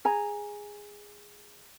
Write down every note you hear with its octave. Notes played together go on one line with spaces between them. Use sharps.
G#4 G#5 A#5